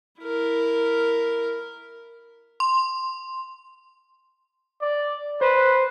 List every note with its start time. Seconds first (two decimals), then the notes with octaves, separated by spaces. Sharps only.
0.21 E4 A#4
2.60 C6
4.81 D5
5.41 B4 C5